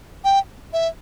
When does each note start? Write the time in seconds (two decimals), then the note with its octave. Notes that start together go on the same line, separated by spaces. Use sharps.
0.24 G5
0.73 E5